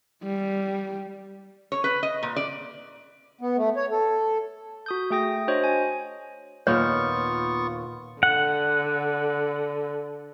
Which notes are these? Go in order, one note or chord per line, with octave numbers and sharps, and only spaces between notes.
G3
C#5
B4
D#5
A#2
D5
B3
A3
C#5
A4
F#4 D#6 G6
A3 G#4 G5 D#6 A#6
D4 F#4 C5 C#5 D#5
G#5
D#2 A#2 B3 F4 C#5 C#6 F6
D3 F#5